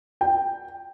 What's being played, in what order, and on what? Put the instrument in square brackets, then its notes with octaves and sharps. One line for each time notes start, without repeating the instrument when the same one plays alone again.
[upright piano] G5